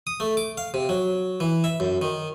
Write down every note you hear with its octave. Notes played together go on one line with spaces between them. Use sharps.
D#6
A3
D6
F5
C3
F#3
E3
E5
F#2
D#3